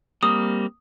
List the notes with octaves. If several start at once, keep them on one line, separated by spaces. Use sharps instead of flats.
G3 A#3 C4 D#6